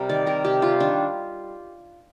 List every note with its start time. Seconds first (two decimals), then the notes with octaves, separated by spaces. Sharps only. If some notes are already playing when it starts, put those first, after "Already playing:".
Already playing: C3 G3 A#4
0.09 D#3 D5
0.26 C3 A#4
0.44 C3 G4
0.62 G3 F4
0.80 D#3 D4